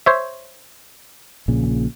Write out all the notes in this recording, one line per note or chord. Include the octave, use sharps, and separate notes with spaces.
C5 C#5 E5
A#1 A#2 C#3